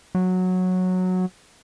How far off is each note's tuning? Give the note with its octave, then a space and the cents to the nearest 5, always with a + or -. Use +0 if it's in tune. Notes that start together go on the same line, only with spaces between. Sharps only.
F#3 -10